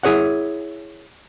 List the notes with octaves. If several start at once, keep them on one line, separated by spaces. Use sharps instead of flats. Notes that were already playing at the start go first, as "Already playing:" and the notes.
E4 G#4 C#5 F#5